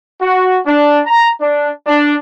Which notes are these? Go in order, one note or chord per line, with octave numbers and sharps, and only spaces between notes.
F#4
D4
A#5
D4
D4